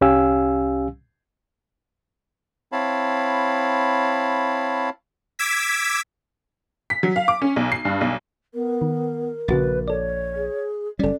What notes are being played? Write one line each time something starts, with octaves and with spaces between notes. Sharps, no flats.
C2 C#4 G4 F5 G#5 E6
C4 E4 C#5 F5 A5 B5
D6 E6 G#6 B6
B6
F#3
F5
D6
C#4
B1
C7
G2
B1
B3 A#4
D#3
A#1 C#3 F#4 B4 A6
A4 C#5 D5
G#4
F#1 G3 C#4 A4 D5